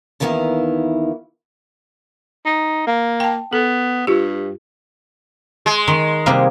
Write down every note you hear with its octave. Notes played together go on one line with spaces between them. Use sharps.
D#2 D#3 E3 B3 E4 F5
D#4
A#3
G5 A5
B3 A4
G2 F4 G4
G#3
D#3
C3 G3 A#3